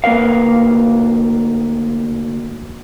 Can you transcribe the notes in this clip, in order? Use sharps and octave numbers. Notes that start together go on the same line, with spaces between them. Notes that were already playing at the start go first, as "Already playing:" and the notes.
D2 A#3 A#4 B4 F5